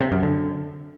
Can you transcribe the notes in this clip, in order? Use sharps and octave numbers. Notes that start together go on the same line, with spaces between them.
C3
F#2
D3